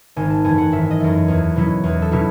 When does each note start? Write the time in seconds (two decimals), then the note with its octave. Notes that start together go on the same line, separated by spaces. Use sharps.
0.16 G#1 G#5
0.30 A5
0.44 F#2 E3 A3 G#5
0.58 F#5
0.72 G#1 E5
0.91 D#5
1.00 F#2 E3 A3
1.28 E2
1.56 B2 F#3 C#4 E4
1.84 E2
2.02 A4
2.12 B2 F#3 C#4 E4